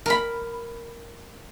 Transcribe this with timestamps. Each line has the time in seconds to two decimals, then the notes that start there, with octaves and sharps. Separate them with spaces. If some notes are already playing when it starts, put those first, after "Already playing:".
0.06 A#4 B5